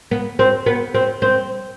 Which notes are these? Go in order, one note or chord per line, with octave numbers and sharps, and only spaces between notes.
B3
C4
B3
C4
C4